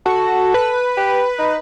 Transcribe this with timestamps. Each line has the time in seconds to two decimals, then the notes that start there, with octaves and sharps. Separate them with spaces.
0.06 F#4 A4
0.54 B4
0.97 G4
1.38 D#4